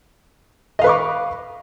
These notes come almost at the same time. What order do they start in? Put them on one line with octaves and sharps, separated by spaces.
D#5 F5 B4 C#6 D6